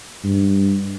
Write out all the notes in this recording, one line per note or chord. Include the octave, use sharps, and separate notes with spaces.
G2